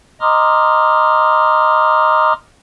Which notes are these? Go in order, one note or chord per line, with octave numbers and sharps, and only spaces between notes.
D#5 A#5 C6 D6 D#6 F6